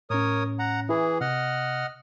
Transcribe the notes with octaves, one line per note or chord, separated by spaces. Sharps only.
A2 C#4 A#4 C#5 D#6
F#5 A#5
E3 E4 G#4 B4
C3 D#5 F#5 F6